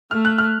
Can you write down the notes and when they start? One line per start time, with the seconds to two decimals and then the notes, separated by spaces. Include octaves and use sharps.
0.11 A3 F6
0.25 F#6
0.38 F6